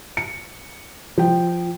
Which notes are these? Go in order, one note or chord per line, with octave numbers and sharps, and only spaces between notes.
C#7
F3 G5